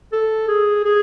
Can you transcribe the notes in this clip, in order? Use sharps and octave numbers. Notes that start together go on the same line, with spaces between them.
A4
G#4
G#4